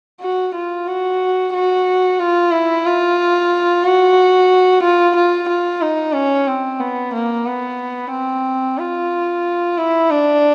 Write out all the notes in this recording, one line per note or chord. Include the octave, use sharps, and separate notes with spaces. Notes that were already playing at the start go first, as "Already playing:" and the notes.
F#4
F4
F#4
F#4
F4
E4
F4
F#4
F4
F4
F4
D#4
C#4
C4
B3
A#3
B3
C4
F4
E4
D4